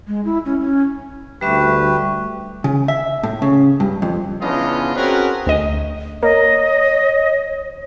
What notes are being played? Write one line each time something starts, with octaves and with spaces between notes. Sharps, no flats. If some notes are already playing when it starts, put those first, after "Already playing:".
G#3
E4
C#4
C#4
D2 G3 G4 B4 E5 C#6
C#3
E5
A2
C#3
G2
F2
C#3 E3 B3 D4 F4 D#5
C4 C#4 F#4 G#4 A#4 B4
D2 D#5
A#3 C#5 D#5